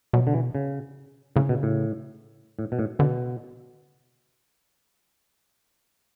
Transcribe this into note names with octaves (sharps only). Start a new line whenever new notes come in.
B2 F#3
D3
E3
C#3
A2 C#3
B2
A2
A2
B2
A2
B2 D3